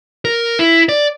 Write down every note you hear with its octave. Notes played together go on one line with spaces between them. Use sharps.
A#4
E4
D5